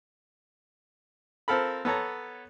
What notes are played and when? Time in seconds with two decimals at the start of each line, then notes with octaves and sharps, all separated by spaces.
1.48 C4 F4 A4 A#4 B5
1.85 B3 A4 C#5 A#5